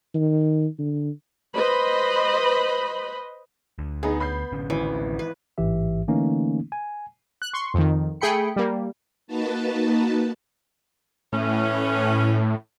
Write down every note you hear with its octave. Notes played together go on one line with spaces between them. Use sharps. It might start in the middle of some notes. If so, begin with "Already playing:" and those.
D#3
D3
B4 C5 D#5 B5
D2
B3 D#4 G#4
B5 G6 C7
A1 D3 C#4
G#1 E3
B4
A1 G#2 E3 G4 E5
D3 E3 A3 A#3 C#4 D#4
G#5
F#6
C6 C#6
F2 D#3
A3 G#4 G5 B5 C#7
G3 A#3
A#3 D#4 F#4 B4 A5
A2 E3 C#4